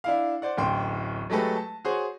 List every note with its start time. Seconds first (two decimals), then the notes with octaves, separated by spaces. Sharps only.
0.04 D4 E4 F5
0.42 C5 D5 F#5
0.57 D1 A1 G5 C6
1.30 F#3 G#3 A3 G4 A4 B4
1.56 A5
1.85 F#4 G#4 C5 C#5